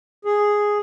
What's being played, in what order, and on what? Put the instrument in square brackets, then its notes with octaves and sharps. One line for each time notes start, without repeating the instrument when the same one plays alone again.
[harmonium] G#4